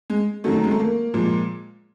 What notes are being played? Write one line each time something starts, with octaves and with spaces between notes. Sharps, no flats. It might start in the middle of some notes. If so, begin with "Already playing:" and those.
G#3
F#2 D#3 F#3 A3
G#3
A3
A#3
A#2 F3 G#3